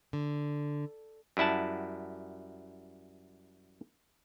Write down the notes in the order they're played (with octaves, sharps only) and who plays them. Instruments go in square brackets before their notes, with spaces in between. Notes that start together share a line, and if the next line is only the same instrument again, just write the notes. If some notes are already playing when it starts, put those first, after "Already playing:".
[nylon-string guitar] D3
[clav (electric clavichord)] F#2 G3 E4 F#5 A5